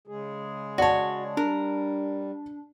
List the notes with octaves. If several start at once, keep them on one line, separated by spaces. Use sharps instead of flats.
C#3 G#3 G#4
F#4 C#5 D5 A5
G3 D4 A#4